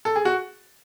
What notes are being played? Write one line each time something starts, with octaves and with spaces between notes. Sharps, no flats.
A4
G#4
F#4